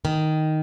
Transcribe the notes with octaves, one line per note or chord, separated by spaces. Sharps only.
D#3